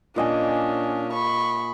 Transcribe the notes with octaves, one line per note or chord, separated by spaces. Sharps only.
A#2 C#4 D4 D#5 G#5
B5 C#6